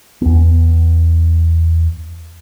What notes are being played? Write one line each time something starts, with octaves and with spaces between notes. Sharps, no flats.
E2 B3